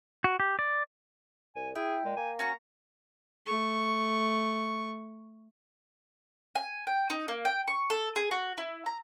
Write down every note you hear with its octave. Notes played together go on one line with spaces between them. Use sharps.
F#4
G4
D5
C2 G#5
E4 G#4 G5
A#2 G#3
A#3 G#5
C#4 F#4 A#5 C#6
A3 C#6
G#5
G5
D#4
A#3
G5
C#6
A4
G#4
F#4
E4
A#5